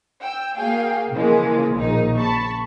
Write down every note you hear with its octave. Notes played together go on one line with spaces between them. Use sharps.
G5 E6
A#3 F#4 G#4 F5 G5
C#3 E3 F3 G#3 A#3
A#1 D#3 A#3 D#4
C#3 A5 B5 C#6